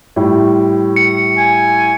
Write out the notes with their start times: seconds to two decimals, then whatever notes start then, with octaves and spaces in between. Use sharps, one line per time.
0.16 A2 G3
0.96 C#7
1.37 G#5